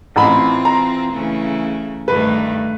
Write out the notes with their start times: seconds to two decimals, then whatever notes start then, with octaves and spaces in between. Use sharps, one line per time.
0.16 A1 E3 C4 F4 A#5 B5
0.65 A#5
1.12 C#3 E3 A3
2.08 G2 D#3 A3 B4